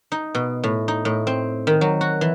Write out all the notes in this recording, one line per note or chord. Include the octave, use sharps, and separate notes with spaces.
D#4
B2
A2
D#4
A2
C4
D#3
F#3
F#4
E3